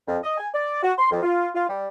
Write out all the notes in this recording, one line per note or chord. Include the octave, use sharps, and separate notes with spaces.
F2
D#5
G#5
D5
F#4
C6
F2
F4
F4
G3